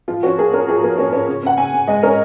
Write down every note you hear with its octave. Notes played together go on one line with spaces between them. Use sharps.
F3 F4
C#4 F#4
A#3 G#4
C#4 A#4
F3 G#4
A#3
C#4
C#4
C#3
C#3 F#5
C#3 G#5
C#3
G#3 D#5
C#4 A#4